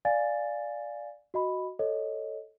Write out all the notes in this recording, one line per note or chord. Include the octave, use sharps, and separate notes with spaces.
D5 F5 G#5 A6
F#4 D#5 B5
A4 C#5 D#5